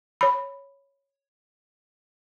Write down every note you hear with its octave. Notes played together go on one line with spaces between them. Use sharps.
C#5 B5